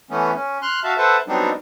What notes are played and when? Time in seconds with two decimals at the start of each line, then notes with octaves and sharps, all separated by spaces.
0.10 E3 A3 B3 C#4
0.35 C#4
0.62 C6 F6 F#6
0.84 F#4 E5 F5 A5
0.98 A4 B4 C5 E5 F#5 A5
1.28 F#3 G3 B3 C4 D4 D#4